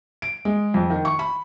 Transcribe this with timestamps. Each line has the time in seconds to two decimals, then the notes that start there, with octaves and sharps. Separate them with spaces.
0.22 D7
0.45 G#3
0.74 F2
0.90 D#3
1.05 C#6
1.19 B5